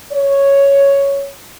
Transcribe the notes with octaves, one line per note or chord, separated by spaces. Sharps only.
C#5